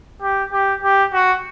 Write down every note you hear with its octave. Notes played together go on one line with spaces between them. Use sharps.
G4
G4
G4
F#4